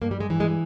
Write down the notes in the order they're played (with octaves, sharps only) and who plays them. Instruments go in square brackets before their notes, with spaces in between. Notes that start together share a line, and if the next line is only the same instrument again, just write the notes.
[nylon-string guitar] G2 A#3
G3
G#3
E3
G#3